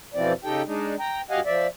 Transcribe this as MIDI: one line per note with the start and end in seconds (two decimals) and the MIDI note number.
0.14 0.33 41
0.14 0.33 47
0.14 0.33 52
0.14 0.33 53
0.14 0.33 60
0.14 0.33 74
0.44 0.62 49
0.44 0.62 63
0.44 0.62 67
0.44 0.62 69
0.44 0.62 79
0.66 0.95 56
0.66 0.95 62
0.66 0.95 63
1.00 1.21 79
1.00 1.21 82
1.30 1.40 42
1.30 1.40 67
1.30 1.40 75
1.30 1.40 77
1.30 1.40 78
1.30 1.40 80
1.46 1.67 53
1.46 1.67 74
1.46 1.67 76